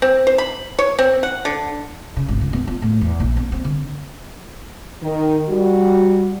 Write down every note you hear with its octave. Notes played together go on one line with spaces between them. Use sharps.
C4
C5
B5
C#5
C4
F#5
D3
C#3
G#1
C#2
B3
F4
A2
E2
A#1
B3
C4
D3
D#3
G3 F#4